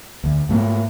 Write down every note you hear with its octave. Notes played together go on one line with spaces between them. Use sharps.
D2
G#2 A3 A#3